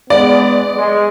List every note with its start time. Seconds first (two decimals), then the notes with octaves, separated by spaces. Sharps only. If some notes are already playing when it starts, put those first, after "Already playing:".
0.10 G#3 B3 D5
0.76 G#3